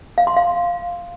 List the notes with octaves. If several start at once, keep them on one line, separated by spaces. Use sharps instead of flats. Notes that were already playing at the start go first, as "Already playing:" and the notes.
F5
C6
F5